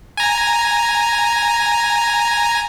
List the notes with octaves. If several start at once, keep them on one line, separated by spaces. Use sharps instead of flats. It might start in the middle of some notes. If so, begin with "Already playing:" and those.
G#5 A#5